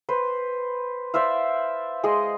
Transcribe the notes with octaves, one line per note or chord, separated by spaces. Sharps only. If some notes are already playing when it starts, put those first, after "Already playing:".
B4 C5
C5 D5 E5 F5
G#3 G#4 D#5 C6